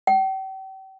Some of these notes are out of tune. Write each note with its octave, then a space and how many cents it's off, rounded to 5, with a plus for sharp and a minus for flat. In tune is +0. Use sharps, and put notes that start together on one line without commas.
G5 -40